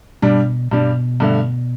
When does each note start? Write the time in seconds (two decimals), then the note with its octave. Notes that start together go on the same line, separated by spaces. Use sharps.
0.22 G2 B2 G3 D4
0.71 G2 B2 G3 D4
1.20 G2 D3 A3